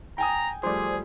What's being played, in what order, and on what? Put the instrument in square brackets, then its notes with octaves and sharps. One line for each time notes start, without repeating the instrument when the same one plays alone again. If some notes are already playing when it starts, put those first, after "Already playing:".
[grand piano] G5 G#5 D#6 [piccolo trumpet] A#5
[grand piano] F3 G3 A3 [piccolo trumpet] G#4 [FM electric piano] C5 D5